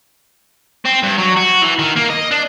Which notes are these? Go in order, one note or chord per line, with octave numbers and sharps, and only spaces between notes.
C4
G2
F#3
F#4
E3
D#3
A#3
D#5
D4